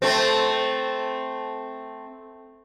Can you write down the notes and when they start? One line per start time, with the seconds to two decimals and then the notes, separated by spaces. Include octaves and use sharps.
0.02 A3 C4